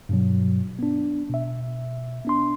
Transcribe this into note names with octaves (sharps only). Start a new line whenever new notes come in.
G2 B2 F#3
B3 D4
B2 E5
B3 D4 C6